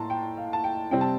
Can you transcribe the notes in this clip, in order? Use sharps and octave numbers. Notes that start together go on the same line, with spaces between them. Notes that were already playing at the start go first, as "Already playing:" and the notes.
Already playing: A2 A#3 A5 A#5 C6
G5
F5
A5
G5
C3 G3 C4 G5
A5